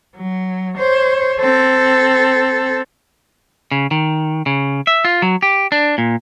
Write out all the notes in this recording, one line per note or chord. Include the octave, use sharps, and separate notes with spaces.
F#3
C5 C#5
C4 A4
C#3
D#3
C#3
E5
F4
F#3
G4
D4
A#2